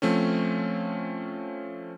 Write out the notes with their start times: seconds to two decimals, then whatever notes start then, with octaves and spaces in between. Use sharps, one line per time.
0.02 F3 A3 C4 C#4